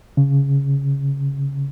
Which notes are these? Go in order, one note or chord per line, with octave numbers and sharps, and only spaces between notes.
C#3